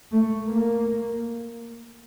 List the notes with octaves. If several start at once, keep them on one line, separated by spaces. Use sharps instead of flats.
A3
A#3